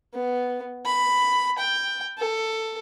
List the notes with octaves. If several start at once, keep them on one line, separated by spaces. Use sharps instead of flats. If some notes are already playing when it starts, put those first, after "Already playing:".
B3
B5
G5
A4